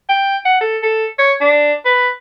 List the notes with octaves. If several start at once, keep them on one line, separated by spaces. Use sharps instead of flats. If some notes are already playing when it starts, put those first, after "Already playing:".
G5
F#5
A4
A4
C#5
D4
B4